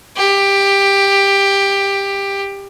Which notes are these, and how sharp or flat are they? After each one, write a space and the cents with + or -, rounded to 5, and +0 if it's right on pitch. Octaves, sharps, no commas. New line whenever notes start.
G4 +15